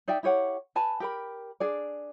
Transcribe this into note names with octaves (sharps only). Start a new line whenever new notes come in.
D#4 D5 E5 G5
E4 G4 C#5 F#5
B4 G#5 A5 B5
G4 A#4 B5
D4 G#4 D5